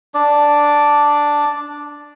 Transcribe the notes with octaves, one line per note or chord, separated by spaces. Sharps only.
D4 D5 D6